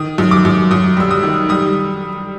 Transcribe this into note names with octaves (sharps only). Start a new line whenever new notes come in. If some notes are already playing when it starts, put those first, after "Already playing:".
Already playing: D#3 D#6
F#2
D6
F#2
F#2 D#6
G3 E6
D#6
D#3
G3 D#6